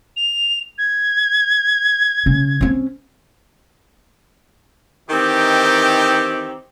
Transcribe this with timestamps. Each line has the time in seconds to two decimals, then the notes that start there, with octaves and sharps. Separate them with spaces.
0.17 F7
0.78 G#6
2.26 C#3 C#4
2.61 C4 C#4
5.08 D#3 E3 C4 D#4 G4